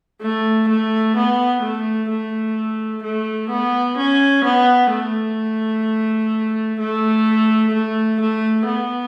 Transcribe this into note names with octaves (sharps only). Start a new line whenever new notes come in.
A3
A3
B3
A3
A3
A3
B3
C#4
B3
A3
A3
A3
A3
B3